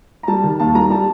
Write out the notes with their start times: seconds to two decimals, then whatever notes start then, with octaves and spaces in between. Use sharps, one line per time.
0.23 A#5
0.28 G3 A5
0.43 D#3
0.60 D#2 A5
0.75 G3 A#5
0.90 G3 A5